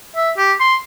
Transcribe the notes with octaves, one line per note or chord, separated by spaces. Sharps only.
E5
G4
C6